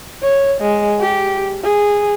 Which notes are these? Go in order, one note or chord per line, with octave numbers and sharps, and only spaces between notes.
C#5
G#3
G4
G#4